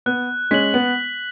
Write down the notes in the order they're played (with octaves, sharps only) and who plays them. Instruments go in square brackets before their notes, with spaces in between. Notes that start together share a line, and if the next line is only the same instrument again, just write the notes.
[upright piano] B3 [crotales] F#6
[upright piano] G#3 C#4 [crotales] B6 F#7
[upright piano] B3